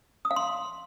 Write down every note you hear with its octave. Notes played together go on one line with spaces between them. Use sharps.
D#6
F5
C6